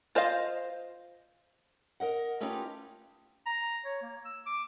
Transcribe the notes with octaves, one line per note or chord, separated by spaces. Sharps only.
F4 C5 D#5 F5
A#4 D#5 F#5
A3 C#4 D#4 F4 G4 B4
A#5
C#5
A#3
E6
D6